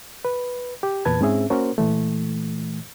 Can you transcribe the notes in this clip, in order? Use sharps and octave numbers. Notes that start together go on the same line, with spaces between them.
B4
G4
E2 A#2 B4 A5 G#6
G#2 C4 C#4 G#4 E5
A#3 C#4 F#4 A#4 C5
A#2 E3 A3